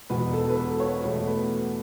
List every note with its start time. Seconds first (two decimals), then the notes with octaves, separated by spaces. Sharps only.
0.10 E1 E2 B2 B4
0.33 A4
0.50 B4
0.56 A4
0.80 C#5
1.03 E2 B2 A3
1.27 B4